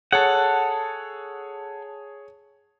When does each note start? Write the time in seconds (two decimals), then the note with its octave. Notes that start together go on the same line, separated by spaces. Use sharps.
0.12 G#4 A4 C#5 F#5